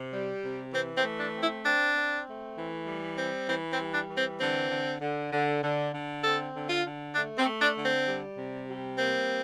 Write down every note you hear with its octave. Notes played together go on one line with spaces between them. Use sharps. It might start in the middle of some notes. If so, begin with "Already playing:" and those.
Already playing: C3
G3
C3
E3 C4
C4
A3
D4
C4
E4
C4 D4
C4
A3
E3
G3
C4
E3 C4
C4
G3
D4
E3
C4
D3 C4
D3
D3
D3
D3
D3
C4 A4
D3
F4
D3
A3 D4
C4
A3
D4
D3
C4
G3
C3
G3
A#3 C4